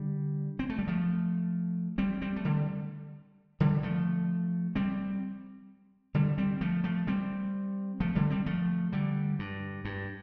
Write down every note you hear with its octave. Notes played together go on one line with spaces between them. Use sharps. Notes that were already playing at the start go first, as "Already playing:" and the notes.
Already playing: D3 G3
C4
A3
G3
F3 A3
G3 C4
G3 C4
A3
D3 G3
D3 G3
F3 A3
G3 C4
D3 G3
G3 C4
F3 A3
F3 A3
G3 C4
F3 A3
D3 G3
G3 C4
F3 A3
D3 G3
G2
G2